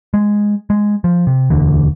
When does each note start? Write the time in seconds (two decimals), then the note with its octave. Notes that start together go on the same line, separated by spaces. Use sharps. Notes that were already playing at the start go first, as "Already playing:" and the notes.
0.14 G#3
0.70 G#3
1.04 F3
1.27 C3
1.50 E1 D2 D3 E3